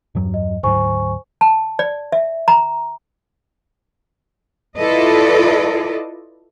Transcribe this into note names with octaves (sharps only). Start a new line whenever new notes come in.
E2 G2 F#3
D#5
D2 G#2 F#3 C5 G#5 C#6
A5
D5
E5
A#5
E4 F4 A4 B4 D5 D#5